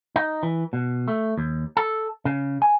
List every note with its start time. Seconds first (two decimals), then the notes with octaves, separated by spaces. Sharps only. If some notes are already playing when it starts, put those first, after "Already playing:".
0.16 D#4
0.43 E3
0.73 B2
1.08 A3
1.37 D#2
1.77 A4
2.25 C#3
2.62 G#5